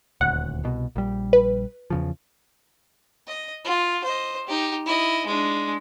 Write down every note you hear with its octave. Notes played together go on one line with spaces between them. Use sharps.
D#1 D2 F#5
C2 B2
A#1 G3
B4
E2 C#3 F3
D#5
F4
C5 D#5
D#4 G4
E4 D#5
G#3 D4